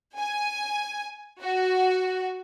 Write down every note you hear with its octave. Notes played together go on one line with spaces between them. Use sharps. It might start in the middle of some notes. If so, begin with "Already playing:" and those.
G#5
F#4